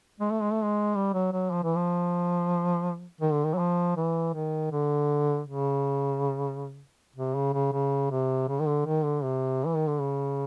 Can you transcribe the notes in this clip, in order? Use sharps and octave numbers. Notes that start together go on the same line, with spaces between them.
G#3
A3
G#3
A3
G#3
G3
F#3
F#3
F3
E3
F3
D#3
D3
D#3
F#3
F3
E3
D#3
D3
C#3
C3
C#3
C#3
C#3
C3
C#3
D#3
D3
D#3
D3
C3
E3
D#3
D3
C#3